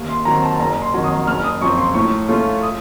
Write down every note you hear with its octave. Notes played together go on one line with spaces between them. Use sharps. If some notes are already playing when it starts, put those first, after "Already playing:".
Already playing: D#2
C6
D#3 F#3 C4 A#5
A5
F#1 A#5
C6
F2 D#3 F#3
D#6
F#1 F6
D#6
F#2 F3 C4 C#6
C6
A2 C#6
A3 C#4 F4
D#6